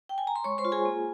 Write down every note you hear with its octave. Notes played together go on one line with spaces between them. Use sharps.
G5
G#5
A#5
C6
G#3 C#5 C#6
C5 C6
F4
G#4 G#5
A#3